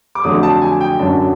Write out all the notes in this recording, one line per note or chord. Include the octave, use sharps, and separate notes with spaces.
D6
F2 D3 F#3 A3 D#6
A5
G#5
G5
F#2 D3 F#3 A5